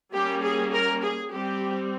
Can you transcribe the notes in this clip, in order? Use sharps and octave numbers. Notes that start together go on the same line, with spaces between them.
G3 A#3 C#4 G4
G#4
A#4
G#4
G3 C4 G4